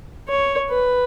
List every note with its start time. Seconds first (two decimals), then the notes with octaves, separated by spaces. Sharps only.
0.29 C#5
0.70 B4